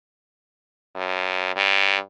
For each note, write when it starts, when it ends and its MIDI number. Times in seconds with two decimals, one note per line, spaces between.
0.95 1.55 42
1.56 1.97 43